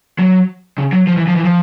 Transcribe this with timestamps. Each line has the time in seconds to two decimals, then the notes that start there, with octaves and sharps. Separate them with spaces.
0.19 F#3
0.78 C#3
0.93 F#3
1.07 F3
1.17 E3
1.27 F3
1.36 E3
1.45 F3